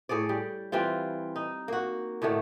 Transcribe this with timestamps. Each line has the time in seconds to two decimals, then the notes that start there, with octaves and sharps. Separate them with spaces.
0.09 A2 G#4 C#5 D5
0.29 G3
0.72 E3 G3 C4 F4
1.36 D#4
1.68 A#3 F#4
2.22 A2 D3 D#3 A3